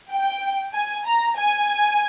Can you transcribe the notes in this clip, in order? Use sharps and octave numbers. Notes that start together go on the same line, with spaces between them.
G5
G#5
A#5
G#5